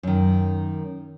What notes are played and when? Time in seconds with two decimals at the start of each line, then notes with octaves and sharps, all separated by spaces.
0.03 F#2 D#3